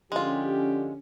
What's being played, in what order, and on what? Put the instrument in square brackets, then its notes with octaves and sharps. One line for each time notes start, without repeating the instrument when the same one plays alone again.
[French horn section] D3 F3 G4 [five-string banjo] G#3 F4 [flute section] C#4